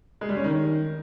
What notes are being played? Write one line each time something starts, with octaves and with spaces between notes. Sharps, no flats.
G#3
G3
C#4
D#3